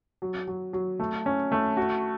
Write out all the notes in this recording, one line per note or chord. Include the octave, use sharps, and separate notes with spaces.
F#3
F#3
F#3
A3
C#4
A3
F#4